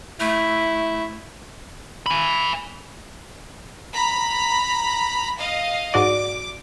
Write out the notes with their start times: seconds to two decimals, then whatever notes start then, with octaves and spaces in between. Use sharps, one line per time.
0.20 A3 E4
2.06 G#5 B5
3.93 A#5 B5
5.39 D#5 F5
5.94 G#2 F#4 D5 D6